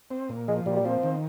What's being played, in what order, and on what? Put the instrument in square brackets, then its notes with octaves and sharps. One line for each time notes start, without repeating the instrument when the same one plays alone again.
[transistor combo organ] C4
A#2
[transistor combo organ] F3 [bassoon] G#3
[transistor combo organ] A#2 [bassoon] G3
[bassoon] G3
[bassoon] F3 [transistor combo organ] C4
[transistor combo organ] D#3